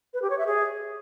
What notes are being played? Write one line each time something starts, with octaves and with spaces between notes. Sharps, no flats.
B4
G4
C#5
E5
G#4